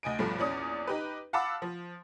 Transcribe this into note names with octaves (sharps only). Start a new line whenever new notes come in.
D2 D#5 G#5 D7
B1 G2 F3 A3
A#1 E2 C#4 D5 D#6
D#4 G4 B4
F5 F#5 A5 B5 D6 E6
F3